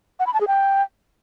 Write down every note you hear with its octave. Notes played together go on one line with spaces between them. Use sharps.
F#5
B5
A5
G#4
G5